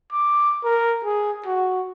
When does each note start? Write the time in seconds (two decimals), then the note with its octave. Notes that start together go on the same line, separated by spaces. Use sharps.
0.12 D6
0.64 A#4
1.04 G#4
1.46 F#4